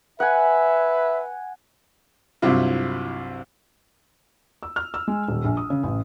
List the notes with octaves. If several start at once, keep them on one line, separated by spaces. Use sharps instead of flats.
B4 E5 F#5 G#5
C2 G2 C3 F#3 E4 F4
E6
F6
E6
G#3
D#1
A#1
D#6
C#3
A1